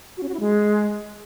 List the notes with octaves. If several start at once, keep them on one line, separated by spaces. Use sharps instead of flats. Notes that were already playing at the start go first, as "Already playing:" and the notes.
F#4
C#4
F#4
E4
G#3